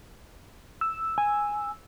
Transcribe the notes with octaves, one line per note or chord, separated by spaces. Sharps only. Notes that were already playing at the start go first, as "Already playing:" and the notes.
E6
G#5